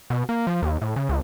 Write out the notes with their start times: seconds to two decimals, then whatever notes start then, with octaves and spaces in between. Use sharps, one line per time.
0.10 B2
0.29 A#3
0.47 F3
0.62 D#2
0.82 A2
0.96 C#3
1.09 C#2